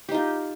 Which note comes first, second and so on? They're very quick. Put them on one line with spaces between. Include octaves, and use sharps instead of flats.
G4 D#4 F4